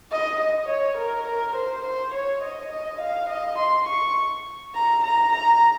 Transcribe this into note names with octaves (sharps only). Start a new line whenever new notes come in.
D#5
D#5
C#5
A#4
A#4
C5
C5
C#5
D#5
D#5
F5
D#5
C6
C#6
A#5
A#5
A#5